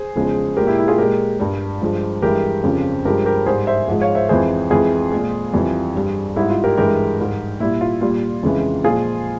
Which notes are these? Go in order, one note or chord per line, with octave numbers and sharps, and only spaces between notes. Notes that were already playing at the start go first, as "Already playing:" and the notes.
Already playing: G#4 C5
E2 C#3 F3 G#3
A#2 G#3 G4 A#4
E4 G4
E4
F4 G#4
A#2 G#3 G4 A#4
G2 G3
G2 F3 G#3
G2 E3 G#3 G4 A#4
F2 C#3 F3
G2 F3 G#3 G4 A#4
G4 A#4
G#2 G3 G#4 C5
C5 E5
G#2 F3 G#3
C#5 F5
C5 E5
F2 E3 G#3 G#4 C5
F2 E3 G#3 F4 G#4
A#2 G#3
F2 E3 G3
G2 G3
G#2 G3 E4
F4
G4 A#4
G2 E3 G#3 G4 A#4
G#2 G3
A#2 G3 E4
F4
A#2 G3 F4
F2 C#3 E3 G#3
A#2 F3 G#3 F4 G#4